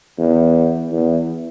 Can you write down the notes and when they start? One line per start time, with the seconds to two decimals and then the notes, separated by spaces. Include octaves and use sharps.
0.18 E2
0.92 E2